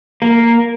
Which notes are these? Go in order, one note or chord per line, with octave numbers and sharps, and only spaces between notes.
A#3